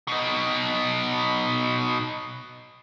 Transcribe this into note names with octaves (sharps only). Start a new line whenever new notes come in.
B2 D#4